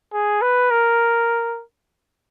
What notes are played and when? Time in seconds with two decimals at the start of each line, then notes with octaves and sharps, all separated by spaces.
0.13 G#4
0.42 B4
0.71 A#4